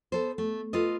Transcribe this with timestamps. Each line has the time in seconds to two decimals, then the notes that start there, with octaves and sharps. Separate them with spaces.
0.12 B3 A4 C5
0.38 A3
0.73 F4 A4 B4 D#5